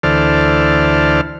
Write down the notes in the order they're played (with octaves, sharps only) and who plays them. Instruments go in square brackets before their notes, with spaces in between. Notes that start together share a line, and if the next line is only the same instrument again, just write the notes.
[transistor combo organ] D2 E3 A4 C5 D5 F6